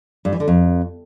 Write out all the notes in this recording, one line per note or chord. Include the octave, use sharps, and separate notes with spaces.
G2
E3
D3
F2